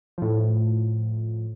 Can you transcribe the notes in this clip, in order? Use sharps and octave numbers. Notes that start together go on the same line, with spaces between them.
A2 F3